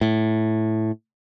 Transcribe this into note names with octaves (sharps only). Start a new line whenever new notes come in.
A2